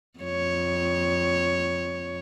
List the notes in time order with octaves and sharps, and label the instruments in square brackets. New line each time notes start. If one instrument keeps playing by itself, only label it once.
[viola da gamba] F2 C#5